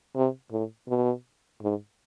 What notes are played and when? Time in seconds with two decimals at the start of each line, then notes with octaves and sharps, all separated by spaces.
0.16 C3
0.52 A2
0.89 B2
1.62 G#2